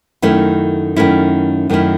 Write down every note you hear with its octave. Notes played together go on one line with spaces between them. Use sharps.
F#2 D#3 A3 C#4 E4
F#2 D#3 A3 C#4 E4
F#2 D#3 A3 C#4 E4